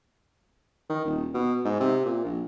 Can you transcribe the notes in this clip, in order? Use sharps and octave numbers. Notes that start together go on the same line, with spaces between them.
D#3
D#1
B2
G#2
C3
A#2
A#1